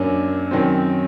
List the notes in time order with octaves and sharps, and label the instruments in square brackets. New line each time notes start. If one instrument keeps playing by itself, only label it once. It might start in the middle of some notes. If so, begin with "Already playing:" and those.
Already playing: [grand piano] F#2 F#3 A#3 D4
F#2 D#3 F#3 C4